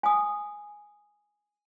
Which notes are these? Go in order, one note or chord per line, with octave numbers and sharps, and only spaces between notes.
G#5 D#6